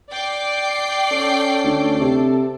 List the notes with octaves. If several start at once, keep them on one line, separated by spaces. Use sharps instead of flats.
D5 G5 D6 C7
C#4 A4
D2
C3 A4